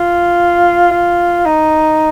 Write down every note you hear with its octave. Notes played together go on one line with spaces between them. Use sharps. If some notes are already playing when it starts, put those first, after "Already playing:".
Already playing: F4
F4
D#4